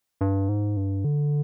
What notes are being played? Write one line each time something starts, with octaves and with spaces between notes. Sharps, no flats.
G2
G#2
G2
D3